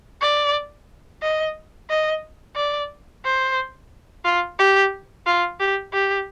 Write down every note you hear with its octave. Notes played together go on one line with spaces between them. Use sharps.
D5
D#5
D#5
D5
C5
F4
G4
F4
G4
G4